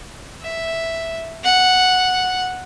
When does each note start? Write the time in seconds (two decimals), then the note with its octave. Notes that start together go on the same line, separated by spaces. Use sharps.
0.42 E5
1.44 F#5